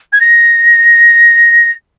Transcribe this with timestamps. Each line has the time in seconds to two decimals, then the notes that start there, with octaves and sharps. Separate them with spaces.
0.12 G#6
0.20 A#6